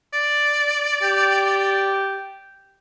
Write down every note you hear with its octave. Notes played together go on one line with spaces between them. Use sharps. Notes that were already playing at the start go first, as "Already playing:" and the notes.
D5
G4